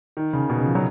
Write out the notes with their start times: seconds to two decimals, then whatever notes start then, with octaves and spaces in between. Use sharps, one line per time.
0.17 D#3
0.33 C#3
0.50 B2
0.58 C#3
0.66 F3
0.75 F#3